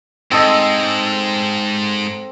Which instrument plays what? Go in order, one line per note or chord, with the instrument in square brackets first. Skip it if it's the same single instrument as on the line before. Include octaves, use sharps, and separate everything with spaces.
[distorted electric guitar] G#2 [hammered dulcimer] C4 A4 D#5